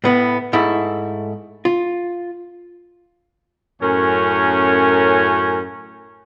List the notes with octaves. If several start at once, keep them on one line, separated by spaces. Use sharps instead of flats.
A2 B3 B4
G#2 A3 E4
F4
F#2 A2 C#4 A#4 C#5 G#5